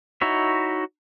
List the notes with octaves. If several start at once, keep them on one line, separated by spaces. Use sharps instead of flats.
D#4 E4 F#4 C#5 E5